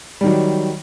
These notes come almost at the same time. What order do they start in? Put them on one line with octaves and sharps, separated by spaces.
G3 D#3 F#3